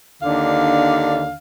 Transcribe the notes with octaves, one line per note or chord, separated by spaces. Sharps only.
D#2 D3 D4 F5